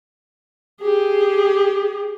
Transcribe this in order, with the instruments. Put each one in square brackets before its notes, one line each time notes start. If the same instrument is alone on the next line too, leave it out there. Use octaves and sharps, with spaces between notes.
[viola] G4 G#4